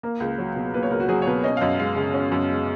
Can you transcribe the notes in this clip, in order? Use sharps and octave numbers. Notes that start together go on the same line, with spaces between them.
A#3 A#4
C#2
F#3
B2
A#3 B4
C#5
C#2 A#4
F#4
F#3 G#4
C#5
B2 B4
C#4 D#5
F5
F#2 D#5
G#3 F5
C#3
C#4
F#2
G#3